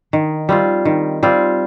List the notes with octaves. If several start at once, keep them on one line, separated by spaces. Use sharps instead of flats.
D#3
G3 C4 F4
D#3
G3 C4 F4